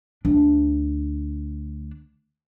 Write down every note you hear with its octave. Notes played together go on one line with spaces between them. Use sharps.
D2 D4